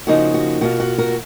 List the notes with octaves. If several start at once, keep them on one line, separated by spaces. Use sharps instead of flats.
C#3 F3 A#3 D#4 F#4
F#4
B2 A#3 F4 F#4
F#4
F#4 A#4